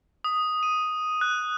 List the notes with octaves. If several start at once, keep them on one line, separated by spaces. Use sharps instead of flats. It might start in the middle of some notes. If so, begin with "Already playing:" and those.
D#6
D#7
F#6